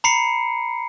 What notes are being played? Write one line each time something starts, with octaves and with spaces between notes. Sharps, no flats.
A#5 B5 C7 C#7